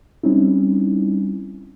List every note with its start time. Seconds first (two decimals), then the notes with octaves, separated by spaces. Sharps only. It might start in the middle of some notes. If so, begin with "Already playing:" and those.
0.23 G3 C4 C#4 D#4 E4